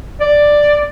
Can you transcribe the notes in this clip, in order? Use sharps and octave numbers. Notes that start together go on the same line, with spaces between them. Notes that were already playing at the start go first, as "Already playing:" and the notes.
D5